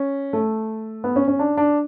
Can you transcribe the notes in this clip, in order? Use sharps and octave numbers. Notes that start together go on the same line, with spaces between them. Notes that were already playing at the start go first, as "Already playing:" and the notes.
Already playing: C#4
A3
B3
C#4
C#4
D4
D4